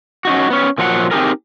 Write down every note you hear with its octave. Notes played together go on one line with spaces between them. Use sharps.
C#4 D#4 F#4
B3 C#4
A#2 F3 F#3 A#4 F#5
C4 D#4 F4 G4 G#4 A#4